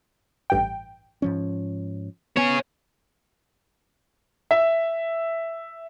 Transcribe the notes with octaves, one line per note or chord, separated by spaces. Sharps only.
A1 G2 G5
G#2 F3 C#4
B3 G#4 C#5
E5